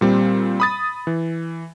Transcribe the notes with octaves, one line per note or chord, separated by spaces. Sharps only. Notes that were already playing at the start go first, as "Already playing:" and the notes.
A#2 G3 C4
B5 D#6 A6
E3